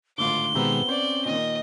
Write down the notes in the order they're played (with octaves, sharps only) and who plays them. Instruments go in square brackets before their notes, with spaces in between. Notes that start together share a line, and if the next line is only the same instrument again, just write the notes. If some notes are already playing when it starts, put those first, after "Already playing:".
[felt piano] G#1 A2 D3 [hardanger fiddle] F4 D6 [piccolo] G7
[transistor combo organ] B2 D#3 G#3 [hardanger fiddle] B3 C4 [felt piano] G4 A#5 E6
[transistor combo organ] C4 C#4 [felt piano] C5 [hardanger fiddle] D5
[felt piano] A#2 D#3 [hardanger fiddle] D#5